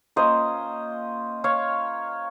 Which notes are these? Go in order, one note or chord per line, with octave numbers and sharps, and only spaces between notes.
A#3 C#4 F4 C5 D#5
C#5 F5